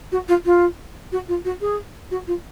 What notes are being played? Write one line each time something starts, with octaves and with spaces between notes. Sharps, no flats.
F#4
F4
F4
F#4
F4
F#4
G#4
F#4
F4